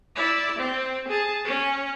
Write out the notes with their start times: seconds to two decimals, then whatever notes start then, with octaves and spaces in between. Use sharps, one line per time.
0.16 E4 D5
0.59 C4
1.08 G#4 A5
1.45 C#4